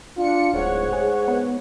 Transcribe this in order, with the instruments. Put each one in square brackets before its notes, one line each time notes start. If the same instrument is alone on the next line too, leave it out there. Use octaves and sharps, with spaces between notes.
[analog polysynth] D4 C#7 [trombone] F4
[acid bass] D1 [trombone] G#2 [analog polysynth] C#5 F#5
[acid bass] G#4
B3